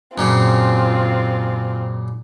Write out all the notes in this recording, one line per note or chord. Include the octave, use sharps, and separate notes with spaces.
F#2 A#2 C#3 C4 F4